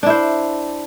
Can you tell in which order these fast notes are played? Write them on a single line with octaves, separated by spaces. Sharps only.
D4 E4 C5